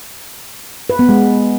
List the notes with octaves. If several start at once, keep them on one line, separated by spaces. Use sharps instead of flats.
B4
B3
G#3